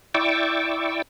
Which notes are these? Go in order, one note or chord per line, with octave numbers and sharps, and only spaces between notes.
E4 D5 G5 C#6 D6 E6